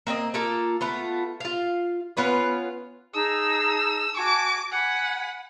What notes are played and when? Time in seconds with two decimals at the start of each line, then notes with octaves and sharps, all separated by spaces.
0.07 A#3 C4 D5 D#5
0.34 A#3 F4 A4
0.81 A3 B3 F4
1.40 F4 F5
2.17 B3 C#4 F4 B4
3.14 D#4 G#4 A5 E6
4.17 F#4 G#5 A5 D6
4.72 F#5 G#5 B5